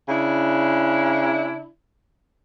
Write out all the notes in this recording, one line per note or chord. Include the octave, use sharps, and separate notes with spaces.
C#3 D4 E4